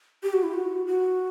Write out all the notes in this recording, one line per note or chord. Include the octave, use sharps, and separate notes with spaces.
G4
F#4
E4
F#4
F#4